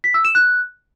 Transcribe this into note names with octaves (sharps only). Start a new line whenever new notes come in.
B6
E6
E7
F#6